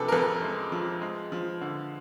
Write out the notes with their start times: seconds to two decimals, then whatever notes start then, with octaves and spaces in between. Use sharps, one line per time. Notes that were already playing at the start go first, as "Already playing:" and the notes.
Already playing: C3 F3 D4 G#4 A4 B4
0.08 A#4
0.12 F2 A4 B4
0.42 G#3
0.72 F3
1.01 G#3
1.32 F3
1.61 D3